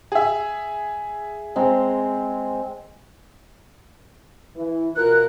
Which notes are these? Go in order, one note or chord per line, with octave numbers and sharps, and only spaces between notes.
G#4 E5
G#3 C4 A#5
E3
B2 F4 A#4 F#6